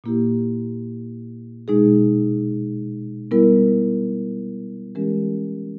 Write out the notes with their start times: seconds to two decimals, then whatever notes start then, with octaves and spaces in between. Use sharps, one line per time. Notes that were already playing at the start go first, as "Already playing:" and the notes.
0.04 A#2 A#3 E4 G4
1.68 B2 G#3 D#4 G#4
3.31 G3 B3 E4 A#4
4.95 E3 G#3 C#4 G4 A#4